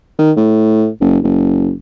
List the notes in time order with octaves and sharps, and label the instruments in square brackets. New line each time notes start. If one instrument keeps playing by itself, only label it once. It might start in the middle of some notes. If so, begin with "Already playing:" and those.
[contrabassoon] D#3
A2
F#1
F#1